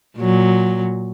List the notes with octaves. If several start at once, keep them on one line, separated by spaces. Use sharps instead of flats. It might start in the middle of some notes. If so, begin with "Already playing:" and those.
A#2 F#3